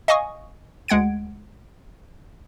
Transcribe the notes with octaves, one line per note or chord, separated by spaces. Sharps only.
D#5 F5 G#5 C#6 D#6
D2 G#3 F#5 G#6 D7